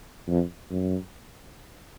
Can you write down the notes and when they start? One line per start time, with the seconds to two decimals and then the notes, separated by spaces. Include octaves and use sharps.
0.28 F2
0.71 F#2